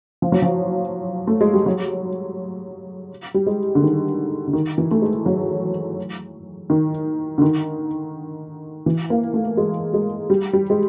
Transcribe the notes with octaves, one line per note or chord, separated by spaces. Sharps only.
F3
F#3
F3
A3
G#3
G3
F#3
G3
G#3
D3
D#3
D3
D#3
E3
A3
G#3
F#3
D#3
D3
D#3
E3
A#3
A3
G#3
G#3
G3
G3
G#3